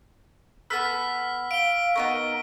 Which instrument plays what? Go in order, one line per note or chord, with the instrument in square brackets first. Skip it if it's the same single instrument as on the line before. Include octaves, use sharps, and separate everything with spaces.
[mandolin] B3 A4 B4 [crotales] E6 F6 B6
[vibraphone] F5 [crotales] D7 G7
[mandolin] B3 D#4 A#4 [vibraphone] C#6